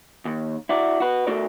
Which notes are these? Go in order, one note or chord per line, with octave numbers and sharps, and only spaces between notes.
D#2
E4 F#4 D5
F#4 B4
A3 F#4 A4 A#4 D5